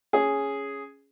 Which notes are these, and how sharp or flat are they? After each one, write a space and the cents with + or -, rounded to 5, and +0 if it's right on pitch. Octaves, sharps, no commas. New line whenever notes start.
C#4 +0 G#4 +0